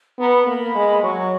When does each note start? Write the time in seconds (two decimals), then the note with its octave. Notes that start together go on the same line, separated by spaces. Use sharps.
0.18 B3 A#5
0.32 B5
0.46 A#3 B5
0.75 G#3
1.03 F#3 C#6